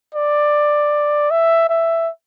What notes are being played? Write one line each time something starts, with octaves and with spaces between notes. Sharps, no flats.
D5
E5
E5